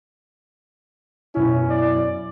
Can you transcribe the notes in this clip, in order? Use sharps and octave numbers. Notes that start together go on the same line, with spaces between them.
F#2 B2 C#4 E4
D5